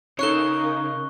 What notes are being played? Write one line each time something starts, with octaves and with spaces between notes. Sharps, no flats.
C#3 D#4 A4 A#4 C#5 C#6 F#6 G7